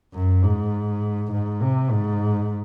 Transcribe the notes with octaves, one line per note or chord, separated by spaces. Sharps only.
F#2
G#2
G#2
C3
G#2